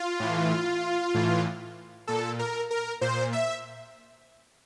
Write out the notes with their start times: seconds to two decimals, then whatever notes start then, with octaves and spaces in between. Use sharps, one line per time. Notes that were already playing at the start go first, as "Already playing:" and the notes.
Already playing: F4
0.20 A2 E3
1.14 A2 E3
2.07 A#2 A4
2.39 A#4
2.71 A#4
3.01 A#2 C5
3.33 E5